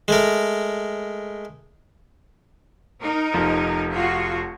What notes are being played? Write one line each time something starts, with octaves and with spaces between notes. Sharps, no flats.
G#3 A3 A#4
D#4 A#4
F1 F3
F4 F#4